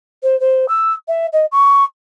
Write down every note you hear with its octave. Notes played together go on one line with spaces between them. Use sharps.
C5
C5
E6
E5
D#5
C#6